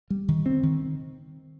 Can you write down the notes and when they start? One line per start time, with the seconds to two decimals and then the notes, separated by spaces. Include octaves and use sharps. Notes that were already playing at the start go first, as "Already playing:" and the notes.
0.10 G3
0.28 D#3
0.46 C4
0.63 D#3